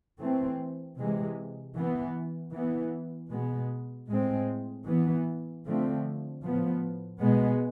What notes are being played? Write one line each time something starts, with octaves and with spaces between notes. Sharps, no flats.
E3 A3 C4
C3 E3 G#3
E3 B3
E3 B3
B2 G#3 B3
A2 G#3 C4
E3 B3
D3 F3 A3 C4
A2 F3 B3
B2 G#3 B3